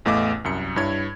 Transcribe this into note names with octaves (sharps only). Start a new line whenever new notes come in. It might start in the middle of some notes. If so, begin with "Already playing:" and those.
A1 E2 A3 D#5 F5 D6
C2 F#2 C#7
G2 E4 C#5 G#6